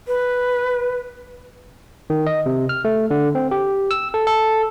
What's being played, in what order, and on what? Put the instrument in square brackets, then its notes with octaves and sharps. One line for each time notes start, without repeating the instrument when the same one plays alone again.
[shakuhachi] B4
[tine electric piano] D#3
D#5
C3
F6
A3
D3
C4
G4
E6
A4
A4